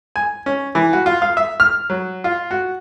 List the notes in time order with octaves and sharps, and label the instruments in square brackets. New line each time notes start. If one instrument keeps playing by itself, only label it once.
[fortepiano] G#5
C#4
E3
F#4
F4
F5
E5
F6
F#3
F4
F#4